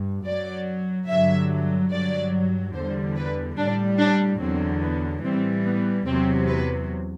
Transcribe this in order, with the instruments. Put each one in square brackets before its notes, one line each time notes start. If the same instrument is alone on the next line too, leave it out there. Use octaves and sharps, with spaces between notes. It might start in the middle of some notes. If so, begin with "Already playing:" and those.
Already playing: [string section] G2
F#2 F#3 D5
G2 D3 F#3 E5
G2 F#3 D5
E2 D3 G3 C5
B4
A2 G3 D4
D4
E2 D3 F#3 C4
B3
A2 E3 G3 C4
B3
E2 C3 F#3 C4
B4